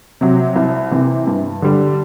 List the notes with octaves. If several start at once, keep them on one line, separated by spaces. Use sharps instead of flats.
C3 F#3
C2
C3 E3
G2
D3 G3